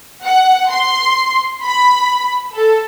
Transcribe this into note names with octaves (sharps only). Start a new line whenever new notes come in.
F#5
C6
B5
A4